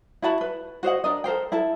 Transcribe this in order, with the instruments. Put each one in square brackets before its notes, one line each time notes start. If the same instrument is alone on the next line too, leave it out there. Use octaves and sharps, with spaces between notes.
[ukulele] E4 F#4 A5 B5
B4
F#4 C5 D#5 F#5
D4 A#4 D#5
A4 A#4 C5 G5
E4 A4 A5